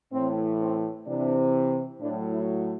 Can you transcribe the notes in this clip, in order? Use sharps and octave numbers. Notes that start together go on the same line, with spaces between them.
A2 E3 C4
C4
C3 E3 D4
A2 F#3 D4
E4